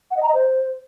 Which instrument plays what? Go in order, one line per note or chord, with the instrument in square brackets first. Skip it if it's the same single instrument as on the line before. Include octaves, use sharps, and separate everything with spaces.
[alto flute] F#5
D#5
A#5
D#5
C5